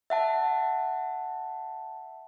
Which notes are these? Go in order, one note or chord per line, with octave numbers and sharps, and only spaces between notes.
E5 F#5 A5